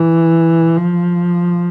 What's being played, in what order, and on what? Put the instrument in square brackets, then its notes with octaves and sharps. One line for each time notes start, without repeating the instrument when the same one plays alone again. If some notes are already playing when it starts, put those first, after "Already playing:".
Already playing: [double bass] E3
F3